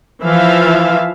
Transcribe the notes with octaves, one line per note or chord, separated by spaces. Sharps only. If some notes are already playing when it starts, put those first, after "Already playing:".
E3 F3 E5 F5